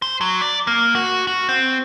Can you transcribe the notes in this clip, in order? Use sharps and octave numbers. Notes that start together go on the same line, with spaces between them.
C5
F#3
D5
A#3
F#4
F#4
C4